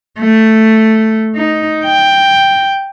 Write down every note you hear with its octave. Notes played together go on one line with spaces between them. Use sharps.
A3
D#4
G5